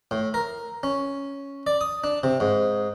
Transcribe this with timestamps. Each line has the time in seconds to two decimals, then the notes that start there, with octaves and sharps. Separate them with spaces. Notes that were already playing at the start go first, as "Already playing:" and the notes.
0.11 A2
0.34 A#4
0.83 C#4
1.67 D5
1.81 D#6
2.04 D4
2.23 C3
2.40 G#2